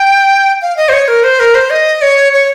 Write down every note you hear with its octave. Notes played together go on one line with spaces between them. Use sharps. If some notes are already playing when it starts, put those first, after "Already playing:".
Already playing: G5
F5
D#5
C5
C#5
A#4
C5
A#4
C5
D#5
C#5
C#5